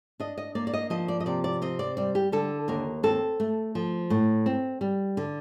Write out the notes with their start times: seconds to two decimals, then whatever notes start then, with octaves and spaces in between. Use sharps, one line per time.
0.20 D4 D#5
0.38 D#5
0.55 A#3 D5
0.67 D5
0.73 D#5
0.90 F3 D#5
1.08 D5
1.20 D#5
1.26 C3 D5
1.44 D5
1.62 C4 D#5
1.79 D5
1.97 G3 D5
2.15 G4
2.32 D3 A4
2.68 D#2 A#4
3.03 C4 A4
3.40 A3
3.75 F3
4.10 A2
4.46 C4
4.81 G3
5.17 D3